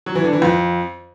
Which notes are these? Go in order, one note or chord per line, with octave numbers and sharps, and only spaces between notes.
F#3
E3
D3
E3
F2